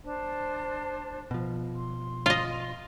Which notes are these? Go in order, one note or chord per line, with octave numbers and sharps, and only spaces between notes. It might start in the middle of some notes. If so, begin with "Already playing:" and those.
D4 C5 A5
B2 F3
C6
F4 D#5